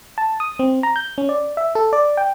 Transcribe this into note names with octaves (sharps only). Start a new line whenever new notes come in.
A5
D#6
C4
A#5
G6
C#4
D5
E5
A4
D5
G5